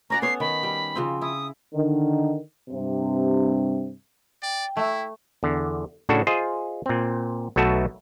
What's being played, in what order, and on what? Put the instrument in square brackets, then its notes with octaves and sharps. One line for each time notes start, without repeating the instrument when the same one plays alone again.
[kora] C#4 D5 F#5 [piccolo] A#5
[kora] B3 A4 C#5 [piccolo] C7
[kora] D#3 [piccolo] B5
[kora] G3
C#3 F3 C4
[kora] E4 [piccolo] D#6
[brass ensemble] D3 D#3
G2 C3
[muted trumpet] D5 [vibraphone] G5
[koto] A3 [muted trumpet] E4
[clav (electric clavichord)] E2 D3
A2 C#3 D4 F#4 A4
F4 G#4 C5 D#5
A#2 C4
B1 B2 A3 F#4 E5 A5